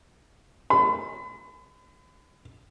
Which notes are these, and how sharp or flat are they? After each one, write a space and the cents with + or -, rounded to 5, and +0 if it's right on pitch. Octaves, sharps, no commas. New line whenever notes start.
B5 +40